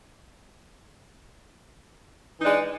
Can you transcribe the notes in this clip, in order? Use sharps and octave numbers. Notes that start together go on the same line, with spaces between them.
E3 G#3 D4 D#4